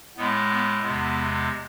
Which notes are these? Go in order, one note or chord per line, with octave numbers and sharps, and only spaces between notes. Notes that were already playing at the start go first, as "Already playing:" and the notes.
A2 G#3 B3
B3
E2 C3 G#3 B3